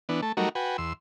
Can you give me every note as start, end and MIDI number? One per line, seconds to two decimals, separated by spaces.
0.09 0.21 52
0.09 0.21 59
0.09 0.21 62
0.22 0.32 57
0.22 0.32 81
0.37 0.49 54
0.37 0.49 55
0.37 0.49 57
0.37 0.49 63
0.37 0.49 66
0.37 0.49 70
0.55 0.77 66
0.55 0.77 71
0.55 0.77 79
0.55 0.77 80
0.78 0.93 40
0.78 0.93 84
0.78 0.93 88